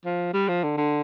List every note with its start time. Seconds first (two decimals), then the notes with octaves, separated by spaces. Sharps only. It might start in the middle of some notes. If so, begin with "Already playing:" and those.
0.05 F3
0.34 G3
0.49 F3
0.64 D3
0.78 D3